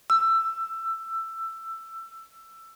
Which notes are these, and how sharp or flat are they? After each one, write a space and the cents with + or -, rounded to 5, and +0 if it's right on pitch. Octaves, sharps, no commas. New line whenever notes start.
E6 +15